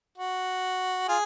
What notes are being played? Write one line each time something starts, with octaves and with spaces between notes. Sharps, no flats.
F#4
F4 G#4